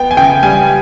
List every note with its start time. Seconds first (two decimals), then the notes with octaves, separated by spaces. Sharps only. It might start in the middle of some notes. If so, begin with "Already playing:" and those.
Already playing: B3 G5
0.11 G#5
0.17 C#3 G5
0.43 G3 G#5